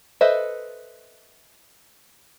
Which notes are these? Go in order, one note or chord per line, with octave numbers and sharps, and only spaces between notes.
A4 B4 C5 D#5 E5